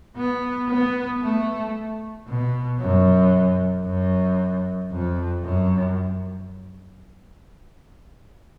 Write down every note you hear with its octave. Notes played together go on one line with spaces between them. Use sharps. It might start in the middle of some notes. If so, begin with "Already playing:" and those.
B3
B3
A3
B2
F#2
F#2
F2
F#2